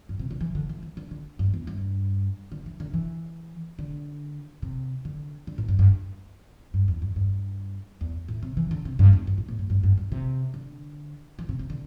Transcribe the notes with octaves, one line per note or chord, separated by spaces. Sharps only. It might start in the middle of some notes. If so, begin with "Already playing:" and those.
G2
C3
D3
E3
D3
E3
E3
D3
D3
G2
E2
G2
D3
E3
D3
E3
D3
C3
D3
D3
A2
G2
G2
G2
E2
G2
G2
E2
A2
C3
E3
D3
C3
G2
E2
G2
A2
A2
G2
G2
G2
G2
C3
D3
E3
C3
C3
D3